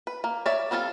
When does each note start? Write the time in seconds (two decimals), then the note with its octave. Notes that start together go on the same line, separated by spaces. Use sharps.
0.07 B4
0.24 A#3
0.46 C#5 D5 E5
0.71 G3 C4 F4 G#4 A4